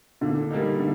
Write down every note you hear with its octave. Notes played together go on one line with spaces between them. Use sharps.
A#2 D3
G3 A#3 D#4
D3